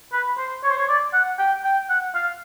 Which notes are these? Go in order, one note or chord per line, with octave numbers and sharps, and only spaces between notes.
B4
C5
C#5
C5
C#5
D5
F#5
G5
G5
F#5
F5